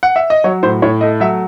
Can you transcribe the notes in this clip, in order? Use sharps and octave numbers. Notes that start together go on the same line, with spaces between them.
F#5
E5
D#5
F#3 C#5
A2 C5
A2 C#5
A3 D#5
F#3 E5